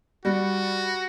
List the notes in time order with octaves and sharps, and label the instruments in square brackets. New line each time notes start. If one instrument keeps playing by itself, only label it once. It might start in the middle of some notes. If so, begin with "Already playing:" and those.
[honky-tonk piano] G3 [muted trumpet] F#4